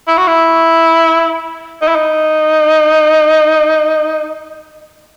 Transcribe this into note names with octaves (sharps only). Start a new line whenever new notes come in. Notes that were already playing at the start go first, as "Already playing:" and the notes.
E4
F#4
E4
D#4
E4
D#4